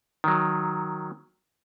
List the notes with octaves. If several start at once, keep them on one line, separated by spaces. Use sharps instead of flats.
D#3 F#3